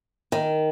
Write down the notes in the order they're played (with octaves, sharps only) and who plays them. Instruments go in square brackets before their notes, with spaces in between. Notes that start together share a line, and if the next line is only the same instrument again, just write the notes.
[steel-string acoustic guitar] D#3